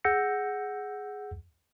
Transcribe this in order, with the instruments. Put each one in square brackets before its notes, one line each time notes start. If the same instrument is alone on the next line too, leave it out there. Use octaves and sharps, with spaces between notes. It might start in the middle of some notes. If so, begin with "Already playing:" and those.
[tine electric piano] G#4 F#5 E6 G6 A#6 C#7